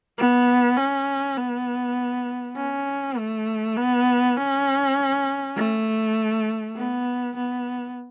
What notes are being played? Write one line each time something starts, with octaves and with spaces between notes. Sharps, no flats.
B3
C#4
B3
C#4
A3
B3
C#4
A3
B3
B3